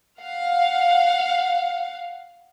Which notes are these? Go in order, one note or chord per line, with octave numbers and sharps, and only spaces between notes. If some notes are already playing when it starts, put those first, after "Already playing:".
F5 F#5